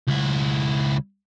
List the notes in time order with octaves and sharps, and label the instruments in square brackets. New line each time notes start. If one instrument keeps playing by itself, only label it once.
[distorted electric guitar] C#2 E4